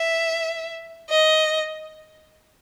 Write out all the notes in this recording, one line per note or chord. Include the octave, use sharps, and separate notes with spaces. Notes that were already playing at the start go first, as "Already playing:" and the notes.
Already playing: E5
D#5